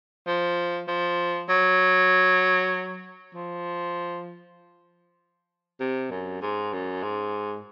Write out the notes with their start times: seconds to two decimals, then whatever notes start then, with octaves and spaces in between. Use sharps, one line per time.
0.27 F3
0.88 F3
1.49 F#3
3.35 F3
5.80 C3
6.11 F#2
6.42 G#2
6.73 F#2
7.03 G#2